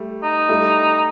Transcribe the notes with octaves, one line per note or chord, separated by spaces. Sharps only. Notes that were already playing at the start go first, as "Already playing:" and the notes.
Already playing: G3 A3
D#4
G3 A3